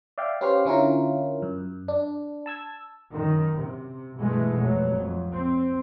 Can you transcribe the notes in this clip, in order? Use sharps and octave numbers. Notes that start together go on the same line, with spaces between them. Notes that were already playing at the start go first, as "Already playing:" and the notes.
D5 E5 F5 G5
C#4 G4 B4 C5 F5
D3 C#4 E4 F4 A#4
F#2
D4
A5 E6 G#6
F#2 D#3
C3
G2 B2 E3 G#3 A3
F1 B2 F#3
F2
C4